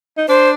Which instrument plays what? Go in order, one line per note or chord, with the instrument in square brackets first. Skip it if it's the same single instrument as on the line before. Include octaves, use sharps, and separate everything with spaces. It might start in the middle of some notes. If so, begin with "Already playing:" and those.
[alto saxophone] D#4
[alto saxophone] D4 [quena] C5